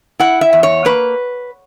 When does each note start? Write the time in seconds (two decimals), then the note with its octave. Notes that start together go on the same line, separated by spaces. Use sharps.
0.20 E4 F#5
0.41 E5
0.53 E2
0.63 C#5
0.85 A#3 B4